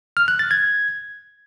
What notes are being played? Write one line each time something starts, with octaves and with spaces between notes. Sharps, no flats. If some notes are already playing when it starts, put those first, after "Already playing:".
F6
F#6
A6
G#6